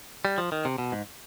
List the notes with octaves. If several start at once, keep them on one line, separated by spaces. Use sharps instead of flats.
G3
F3
D#3
C3
B2
G#2